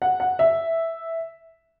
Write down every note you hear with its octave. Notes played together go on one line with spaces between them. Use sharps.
F#5
F#5
E5